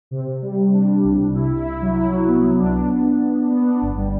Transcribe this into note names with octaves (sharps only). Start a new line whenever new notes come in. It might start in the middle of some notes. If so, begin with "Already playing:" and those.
C3
C3
G3
C3
D4
G3
C2
C2
E4
E4
E4
F#3
E4
F#3
B3
F#3
D4
B3
D4
D4
B3
D4
B3
D4
G1
G3